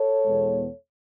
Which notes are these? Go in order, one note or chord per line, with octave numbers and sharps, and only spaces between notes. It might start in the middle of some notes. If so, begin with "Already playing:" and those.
Already playing: A4 C#5
E2 B2 G#3 B3